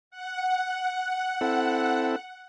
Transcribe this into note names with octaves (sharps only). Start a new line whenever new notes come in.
F#5
C4 E4 A4